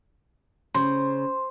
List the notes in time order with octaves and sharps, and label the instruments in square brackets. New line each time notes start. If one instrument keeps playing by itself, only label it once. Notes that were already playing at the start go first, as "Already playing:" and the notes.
[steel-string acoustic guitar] C#3 [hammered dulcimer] C5